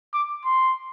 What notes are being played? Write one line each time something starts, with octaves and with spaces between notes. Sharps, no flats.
D6
C6